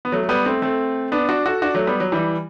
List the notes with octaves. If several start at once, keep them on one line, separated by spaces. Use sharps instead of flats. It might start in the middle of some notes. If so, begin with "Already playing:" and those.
B3
F#3 A3
A3
G3 B3
A3 C4
A3 C4
B3 D4
D4 F#4
F#4 A4
D4 F#4
F#3 A3
G3 B3
F#3
E3 G3